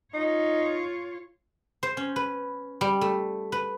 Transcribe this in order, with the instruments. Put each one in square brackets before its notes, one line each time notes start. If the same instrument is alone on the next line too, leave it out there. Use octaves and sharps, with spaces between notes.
[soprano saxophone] D#4 [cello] F4 C#5
[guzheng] C5
C#4
B4
G3
A3
B4